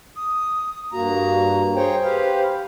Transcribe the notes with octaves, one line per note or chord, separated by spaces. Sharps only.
D#6
G2 A#3 F#4 A#5
G#4 C5 C#5 G5
G4 B4 F5